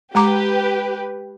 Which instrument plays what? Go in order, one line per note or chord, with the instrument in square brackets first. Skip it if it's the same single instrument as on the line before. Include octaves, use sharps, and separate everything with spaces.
[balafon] G#3 A#5 D6 [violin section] G4 B4